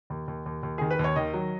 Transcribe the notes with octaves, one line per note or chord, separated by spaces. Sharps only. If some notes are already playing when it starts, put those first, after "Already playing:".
D#2
D#2
D#2
D#2
D#3 G#4
B4
D#2
C#5
D#3 D#5
F#3